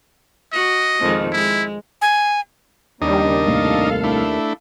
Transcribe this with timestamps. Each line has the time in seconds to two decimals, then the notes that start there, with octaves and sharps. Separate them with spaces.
0.53 F#4 D#5
1.01 F2 D#3 G#3
1.32 G#3 E4
2.02 G#5
3.02 D#2 C#3 G3 D4 D#4 D#5
3.47 C2 A2 A#3 A4 F5
4.04 A3 D4 E4